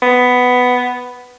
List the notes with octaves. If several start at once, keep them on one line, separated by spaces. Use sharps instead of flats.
B3